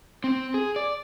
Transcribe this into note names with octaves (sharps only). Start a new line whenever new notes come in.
C4
G#4
D5